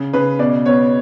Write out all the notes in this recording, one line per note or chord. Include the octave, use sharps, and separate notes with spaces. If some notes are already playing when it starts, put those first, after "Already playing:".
Already playing: C#3
C#3 B4
B2 D5
B3 C#5